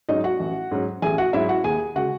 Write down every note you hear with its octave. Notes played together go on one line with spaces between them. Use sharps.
G#2 F#3 C#4 D#4 D#5
F#4 F#5
A1
G#2 F#3 C#4
A1 G#4 G#5
F#4 F#5
G#2 F#3 C#4 E4 E5
F#4 F#5
D#2 G#4 G#5
C#3 G#3 F#4 F#5